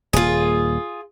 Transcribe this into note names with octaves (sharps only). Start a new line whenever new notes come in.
D#1 A#3 F4 G#4